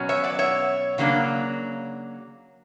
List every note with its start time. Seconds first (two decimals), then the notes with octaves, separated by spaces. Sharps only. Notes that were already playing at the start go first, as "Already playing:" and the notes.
Already playing: B2 F#3 C#4
0.09 C#5 E5
0.24 D5 F#5
0.39 C#5 E5
0.98 C#3 F#3 A#3 D4